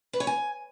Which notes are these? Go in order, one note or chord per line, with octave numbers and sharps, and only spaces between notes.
B4
C#5
G#5